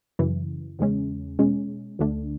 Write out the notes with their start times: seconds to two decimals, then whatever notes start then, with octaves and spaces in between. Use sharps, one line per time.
0.19 F#2 C#3 E3
0.79 E2 C#3 G#3 C#4
1.39 B2 G#3 C#4
1.99 D2 D3 A3 D4